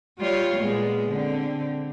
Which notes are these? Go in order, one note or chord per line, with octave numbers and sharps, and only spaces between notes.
G3 F4 C#5
A#2 G#3 B3
D3 C4